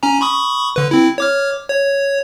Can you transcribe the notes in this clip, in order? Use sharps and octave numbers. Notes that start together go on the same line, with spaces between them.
C#4 G#5 A#5
B5 C#6 D#6
D3 B4
C4 E4
C#5 D6 F6
C#5